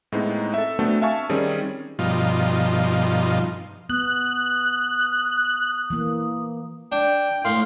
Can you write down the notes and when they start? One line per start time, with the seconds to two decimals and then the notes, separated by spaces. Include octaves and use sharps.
0.12 A2 G#3 B3 C4 D#4
0.54 A4 E5
0.79 A3 B3 C4 D4 F#4 A4
1.02 E5 F5 G#5 A5 C#6
1.29 D#3 G3 C4 C#4 G#4
1.99 G2 B2 F3 D#4 F4
3.89 B3 D#6 F#6
5.90 E3 A#3
6.92 D4 G5
7.45 A2 F5 C6